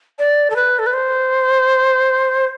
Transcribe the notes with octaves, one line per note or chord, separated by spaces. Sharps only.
D5
A4
B4
A4
B4
C5